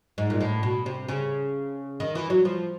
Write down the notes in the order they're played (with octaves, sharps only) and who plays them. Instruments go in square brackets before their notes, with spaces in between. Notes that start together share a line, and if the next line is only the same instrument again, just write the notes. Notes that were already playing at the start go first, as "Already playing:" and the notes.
[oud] G#2
A#2
A2
B2
C3
C#3
D#3
E3
F#3
F3